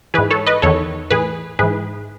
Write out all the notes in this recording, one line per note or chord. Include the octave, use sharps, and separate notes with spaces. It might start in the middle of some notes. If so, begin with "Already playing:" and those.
G#2 E3 G#4 B4
A4 C#5
B4 D#5
E2 D#3 A4 C#5
A2 E3 G#4 B4
G#2 E3 G#4 B4